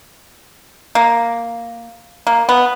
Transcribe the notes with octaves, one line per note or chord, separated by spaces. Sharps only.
A#3
A#3
B3